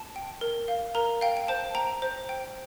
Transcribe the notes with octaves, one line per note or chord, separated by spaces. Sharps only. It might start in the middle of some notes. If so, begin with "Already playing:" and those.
Already playing: A5
G5
A#4
F5
A#4 A#5
F5 G5
G5
C5 A5
G5 A#5
C5
G5